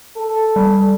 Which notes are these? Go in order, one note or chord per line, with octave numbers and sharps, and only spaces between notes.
A4
G3